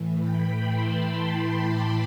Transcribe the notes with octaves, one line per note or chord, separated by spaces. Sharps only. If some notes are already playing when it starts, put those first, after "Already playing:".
Already playing: A2 E3
G5 B5
A5 C6
B5 D6